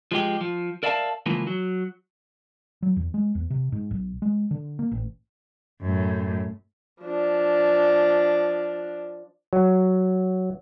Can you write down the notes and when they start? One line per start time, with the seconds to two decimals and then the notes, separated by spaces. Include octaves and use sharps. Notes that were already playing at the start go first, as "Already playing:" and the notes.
0.12 F3 G#3 G4
0.41 F3
0.83 A#4 D5 E5 F5 G#5 A5
1.26 C#2 E3 F3 A#3
1.47 F#3
2.82 F#3
2.96 E2
3.14 G#3
3.35 E2
3.50 C3
3.72 G#2
3.91 B1
4.22 G#3
4.51 D3
4.79 A#3
4.91 A1
5.82 F#2 A2
7.02 F3 D4
9.53 F#3